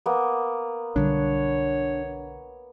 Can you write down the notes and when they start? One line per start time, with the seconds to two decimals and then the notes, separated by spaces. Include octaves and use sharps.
0.06 A#3 B3
0.96 B1 D3 G3 D4 C#5